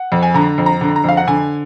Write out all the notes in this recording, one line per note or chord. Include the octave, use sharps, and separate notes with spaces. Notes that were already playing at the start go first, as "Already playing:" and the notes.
Already playing: F#5
F2
G#5
D3 A#5
F2
A#5
D3
A#5
F2 F5
F#5
D3 G#5